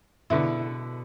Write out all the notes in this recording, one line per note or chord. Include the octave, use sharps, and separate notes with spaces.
B2 D3 B3 E4